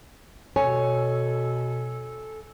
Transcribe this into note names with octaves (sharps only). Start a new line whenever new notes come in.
B2 A4 C#5 G#5